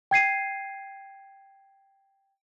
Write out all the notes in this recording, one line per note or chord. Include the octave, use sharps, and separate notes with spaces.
G5 G#6 C7 D#7